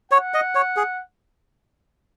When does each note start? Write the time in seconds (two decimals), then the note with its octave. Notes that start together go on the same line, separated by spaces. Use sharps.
0.11 C#5 F#5
0.34 D#5
0.55 C#5
0.76 G#4